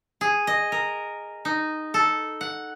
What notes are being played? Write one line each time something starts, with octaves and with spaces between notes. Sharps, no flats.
G#4
D#5
A#4
D#4
A4
F#5